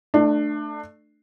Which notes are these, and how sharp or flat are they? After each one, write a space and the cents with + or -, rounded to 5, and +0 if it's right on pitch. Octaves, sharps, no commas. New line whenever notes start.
A3 +0 D4 +25